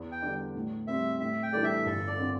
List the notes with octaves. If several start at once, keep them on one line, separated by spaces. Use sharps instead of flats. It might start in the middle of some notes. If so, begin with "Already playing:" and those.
Already playing: E2
G5
D3 G3 D4
A2
G3 C4 E5
A2 E5
G5
E3 G3 D4 A4 D5
E5
G1 A4
D5
D3 C4